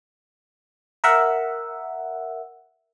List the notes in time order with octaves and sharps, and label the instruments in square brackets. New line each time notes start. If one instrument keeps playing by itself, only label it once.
[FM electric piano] A#4 E5 F#5